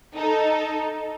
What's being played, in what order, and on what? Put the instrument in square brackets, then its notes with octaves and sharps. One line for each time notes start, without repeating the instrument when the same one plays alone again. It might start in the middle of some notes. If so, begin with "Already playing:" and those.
[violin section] D#4 A4